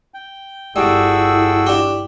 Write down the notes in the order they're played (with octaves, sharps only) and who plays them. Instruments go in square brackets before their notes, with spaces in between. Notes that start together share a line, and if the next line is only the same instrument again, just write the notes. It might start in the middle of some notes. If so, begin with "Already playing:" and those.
[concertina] G5
[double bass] G1 E4 [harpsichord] G3 [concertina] F#4 E6 [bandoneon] G#4 A4 G5
[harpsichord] D4 G4